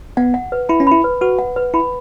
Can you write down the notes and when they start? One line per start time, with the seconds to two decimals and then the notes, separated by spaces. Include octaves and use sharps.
0.17 B3 F#5
0.34 F#5
0.52 B4
0.69 E4 B5
0.80 C#4
0.87 E4 B5
1.04 B4
1.21 F#4 B4
1.39 F#5
1.56 B4
1.74 E4 B5